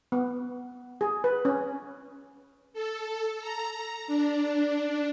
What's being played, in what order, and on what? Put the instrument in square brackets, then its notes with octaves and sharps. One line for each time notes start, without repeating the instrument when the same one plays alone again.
[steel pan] B3
G#4
B4
C#4
[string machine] A4
A#5
D4